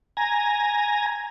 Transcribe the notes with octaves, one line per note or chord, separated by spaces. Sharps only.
G#5 A#5